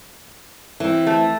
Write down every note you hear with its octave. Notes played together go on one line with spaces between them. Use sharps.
E3 C4
A3